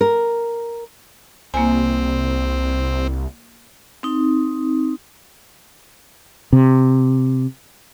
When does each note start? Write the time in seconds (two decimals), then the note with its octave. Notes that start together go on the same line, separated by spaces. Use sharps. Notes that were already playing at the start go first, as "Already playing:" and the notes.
0.01 A#4
1.54 C2 A#3 C4 G#5
4.03 C4 D#4
6.53 C3